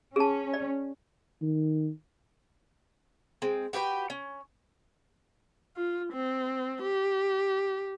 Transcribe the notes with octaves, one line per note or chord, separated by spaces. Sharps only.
C#4 G#4 A5
D5
D#3
G#3 C4
F#4 G4 B4 G5
C#4
F4
C4
G4